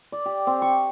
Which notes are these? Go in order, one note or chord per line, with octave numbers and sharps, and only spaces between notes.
D5
G4
C4
C#6